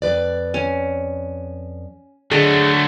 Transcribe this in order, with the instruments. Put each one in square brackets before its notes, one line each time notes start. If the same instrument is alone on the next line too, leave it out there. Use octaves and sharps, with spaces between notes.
[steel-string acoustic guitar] F2 B4 D5
[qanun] C#4
[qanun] D3 [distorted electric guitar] F#3 A3 [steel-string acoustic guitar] G#4 D#5 A5